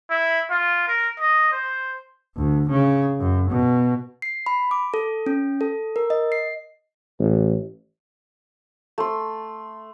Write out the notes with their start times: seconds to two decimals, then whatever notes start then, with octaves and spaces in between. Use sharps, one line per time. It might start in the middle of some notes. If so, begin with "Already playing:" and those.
0.10 E4
0.50 F4
0.88 A#4
1.19 D#5
1.52 C5
2.37 D2
2.69 C#3
3.20 F#2
3.50 B2
4.22 C7
4.46 B5
4.71 D6
4.94 A4
5.26 C#4
5.61 A4
5.96 A#4
6.10 D#5
6.32 C7
7.19 A1
8.98 A3 C6